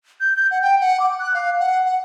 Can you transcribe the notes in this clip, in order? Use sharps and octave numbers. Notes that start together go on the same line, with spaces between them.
G6
G6
F#5
G5
F#5
D6
F#6
F5
F#5
F#5